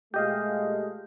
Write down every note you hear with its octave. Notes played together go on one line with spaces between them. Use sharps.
A#2 G#3 A3 G4 D#5 F5 G6